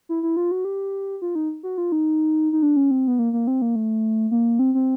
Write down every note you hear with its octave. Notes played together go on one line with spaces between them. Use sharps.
E4
E4
F4
F#4
G4
F4
D#4
F#4
F4
D#4
D#4
D4
C#4
C4
B3
A#3
A#3
C4
A#3
A3
A#3
C4
C4